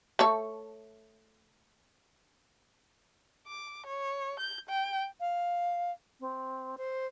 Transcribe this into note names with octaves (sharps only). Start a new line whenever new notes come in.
A3 A4 C#5
D6
C#5
G6
G5
F5
C4
C5